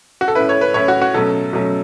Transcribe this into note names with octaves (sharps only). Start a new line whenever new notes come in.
F#4
A4
A2 A3 C#4 E4 B4
C#5
B4
A2 A3 C#4 E4 C#5
F#4
F#4
B2 F#3 A3 C#4 A4
B2 F#3 A3 C#4